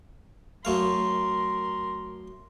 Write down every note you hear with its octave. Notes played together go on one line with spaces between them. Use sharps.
F#2 A3 A#4 F5 C6